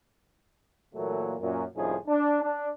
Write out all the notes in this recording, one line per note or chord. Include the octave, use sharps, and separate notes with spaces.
A#2 E3 F#3 A3 A#3
F#2 A#2
C2 A2 F3 C#4 D#4 G#4
D4
D4